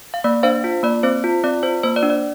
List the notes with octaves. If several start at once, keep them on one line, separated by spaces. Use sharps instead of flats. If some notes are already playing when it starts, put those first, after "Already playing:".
F5
A#3 D5
D4 C5 F5
F4
A#3 D5
C4 C5
F4
C4 D5
F4 C5
A#3 C5
D5
D4
D5